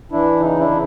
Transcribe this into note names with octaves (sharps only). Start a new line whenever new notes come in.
E3 D4 E4
C#3 D#4
D4 E4
C#3